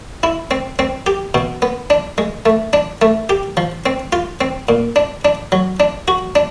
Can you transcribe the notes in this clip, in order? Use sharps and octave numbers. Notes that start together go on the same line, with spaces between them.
E4
C4
C4
G4
B2
B3
D4
G#3
A3
D4
A3
G4
F3
C4
F4
C4
A#2
D4
D4
F#3
D4
F#4
D4